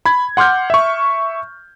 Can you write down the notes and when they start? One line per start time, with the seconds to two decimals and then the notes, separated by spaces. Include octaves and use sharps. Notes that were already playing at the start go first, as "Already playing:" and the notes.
0.06 B5 G#6
0.37 F#5 C6 D6 F6 G6
0.70 E5 C#6